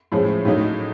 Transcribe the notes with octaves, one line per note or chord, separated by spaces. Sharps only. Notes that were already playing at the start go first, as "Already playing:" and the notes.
A2 F3 G#3 C#4
A2 F#3 A#3 D#4